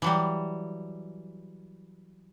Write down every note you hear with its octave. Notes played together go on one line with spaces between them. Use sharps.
E3 F#3 G3